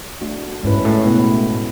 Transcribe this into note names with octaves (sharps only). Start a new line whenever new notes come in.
A3 D4 F#4
G#2 G#3 C#4 E4 B4
G#2
A2
B2 G#3 B3 E4 B4